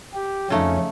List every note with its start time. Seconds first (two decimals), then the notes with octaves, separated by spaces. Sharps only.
0.14 G4
0.50 F2 C#3 A3 C#4 D#4